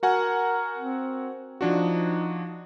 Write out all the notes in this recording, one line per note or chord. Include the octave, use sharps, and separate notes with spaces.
F#4 A#4 F#5 G#5
C4
F3 D4 D#4 F#4